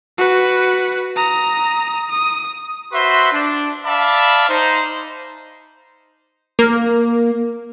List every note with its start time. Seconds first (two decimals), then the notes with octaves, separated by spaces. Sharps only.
0.18 F#4 B4
1.16 A#5 D#6
2.09 D#6
2.93 F#4 B4 C5 E5 C6
3.33 D4
3.86 D5 E5 F5 A5 B5
4.49 D#4 C5
6.59 A#3